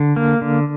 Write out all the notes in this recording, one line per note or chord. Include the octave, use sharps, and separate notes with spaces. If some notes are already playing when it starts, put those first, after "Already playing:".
Already playing: D3
A#3
D3